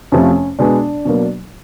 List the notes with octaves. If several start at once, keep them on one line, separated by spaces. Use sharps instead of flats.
F2 C3 F3 A3 C#4
B2 G#3 B3 D4
B2 F#3 A#3